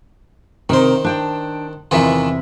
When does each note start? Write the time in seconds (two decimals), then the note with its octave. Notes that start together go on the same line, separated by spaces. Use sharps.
0.69 C3 D#3 D#4 A#4 C5
1.04 D4 G5
1.91 E2 C3 D#3 E3 F4 E5